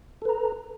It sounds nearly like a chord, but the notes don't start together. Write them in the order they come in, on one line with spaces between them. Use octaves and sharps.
A4 B4 A#5